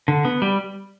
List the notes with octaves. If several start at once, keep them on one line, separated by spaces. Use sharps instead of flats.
D3
B3
G3